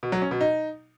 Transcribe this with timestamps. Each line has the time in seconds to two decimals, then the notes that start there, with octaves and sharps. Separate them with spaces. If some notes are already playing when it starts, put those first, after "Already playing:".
0.03 B2
0.12 F#3
0.22 C#4
0.31 B2
0.41 D#4